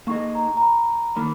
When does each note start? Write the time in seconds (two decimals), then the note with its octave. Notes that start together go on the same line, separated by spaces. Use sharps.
0.07 A#3 D#4 G#4 D#5 C#6
0.35 A#5
0.57 A#5
0.62 B5
1.16 D#3 A#3 B5